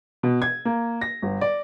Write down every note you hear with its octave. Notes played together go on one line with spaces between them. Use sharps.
B2
G#6
A#3
A#6
G1
D5